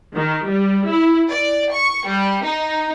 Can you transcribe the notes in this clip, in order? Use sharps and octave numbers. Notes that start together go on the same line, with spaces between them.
D#3
G3
E4
D5
C#6
G3
D#4